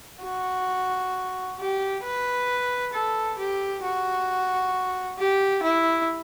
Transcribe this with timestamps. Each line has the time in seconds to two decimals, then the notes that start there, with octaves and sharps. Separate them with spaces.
0.23 F#4
1.59 G4
2.04 B4
2.94 A4
3.39 G4
3.83 F#4
5.19 G4
5.63 E4